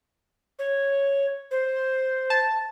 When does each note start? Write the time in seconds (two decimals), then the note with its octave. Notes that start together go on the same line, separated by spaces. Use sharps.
0.59 C#5
1.51 C5
2.30 A5